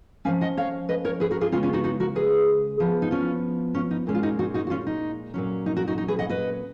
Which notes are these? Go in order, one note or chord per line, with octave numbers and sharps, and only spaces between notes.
F3 A#3 C#4 F5 G#5
D#5 F#5
C#5 F5
B4 D#5
A#4 C#5
G#4 B4
F#4 A#4
F4 G#4
C#3 G#3 B3 C#4 F4
C#4 F4
D#4 F#4
D#4 F#4
F#4 A#4
G#4 B4
F3 B3
D#4
C#4 F4
C#4 F4
D#4
A#2 G#3 C#4
F4
D#4 F#4
D#4 F#4
D#4 F#4
F#4
C#4 F4
D#4
A#2 F#3 C#4
D#4
F#4 A#4
D#4 F#4
D#4
G#4 B4
D#5 F#5
B4 D#5